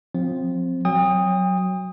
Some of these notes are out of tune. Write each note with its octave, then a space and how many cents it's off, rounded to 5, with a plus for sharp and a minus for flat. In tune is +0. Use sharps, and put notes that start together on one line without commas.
F3 +20 C4 +0
F#3 +0 G5 +40 D#6 +0